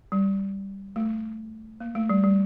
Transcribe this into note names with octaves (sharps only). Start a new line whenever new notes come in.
G3
A3
A#3
A3
G3
G3